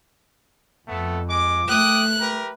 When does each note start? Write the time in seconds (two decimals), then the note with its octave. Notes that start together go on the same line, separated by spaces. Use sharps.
0.88 F2 A3 B3 A4
1.28 G#3 D6
1.68 A3 G5 D6 D#6 F#6
2.21 G4 A#4 B4